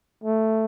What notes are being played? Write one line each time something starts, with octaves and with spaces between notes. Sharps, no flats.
A3